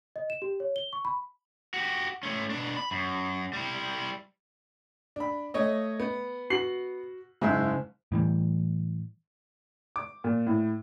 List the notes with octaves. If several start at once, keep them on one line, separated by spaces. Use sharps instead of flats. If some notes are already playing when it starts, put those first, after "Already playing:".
D#5
E7
G4
C#5
G7
C#6
B5
F#4 G4
A3 C#4
B2 D4
B5
F#2
G3 E4
D4 B5
A3 C#5 D#5
B3
F#4 C7 F#7
F#1 G#2 G#3 G#4 E5 E6
A2 E3 G3
D6
A#2
A2